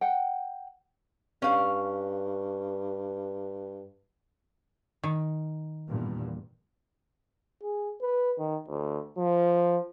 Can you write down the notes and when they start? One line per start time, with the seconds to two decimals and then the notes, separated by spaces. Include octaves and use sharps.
0.01 F#5 G5
1.42 G2 C#4 F5
5.03 D#3
5.88 E2 G2 A#2
7.63 G#4
8.01 B4
8.38 D#3
8.68 D2
9.18 F3